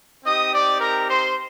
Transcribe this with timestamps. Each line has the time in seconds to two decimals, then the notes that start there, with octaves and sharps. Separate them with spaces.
0.25 C4 D#4 G4 D#5 D#6
0.52 D5 D6
0.80 A#4 A#5
1.08 C5 C6